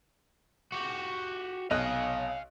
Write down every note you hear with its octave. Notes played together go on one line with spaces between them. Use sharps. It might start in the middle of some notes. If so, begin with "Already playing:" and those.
F#4 G4
B1 D#5 F5 G#5 F#6